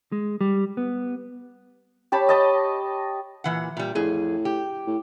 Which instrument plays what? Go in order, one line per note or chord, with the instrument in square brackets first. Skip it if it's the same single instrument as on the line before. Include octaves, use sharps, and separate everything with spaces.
[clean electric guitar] G#3
G3
B3
[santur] G4 C#5 A5 B5
D#5 A5 D#6
[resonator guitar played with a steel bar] A#2 E3 F#5
A#2 G3
[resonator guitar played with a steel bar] F2 G#4 [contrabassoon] A2
[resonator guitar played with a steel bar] G4
[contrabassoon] A2